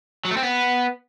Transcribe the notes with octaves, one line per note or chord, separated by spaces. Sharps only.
F#3
A3
C4
B3